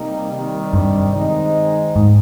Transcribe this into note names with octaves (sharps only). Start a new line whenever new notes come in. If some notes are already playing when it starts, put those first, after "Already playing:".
Already playing: C3 G3 A#3 D#4
C3 D#3 G3
G2
D#3 G#3 C4 D#4
G#2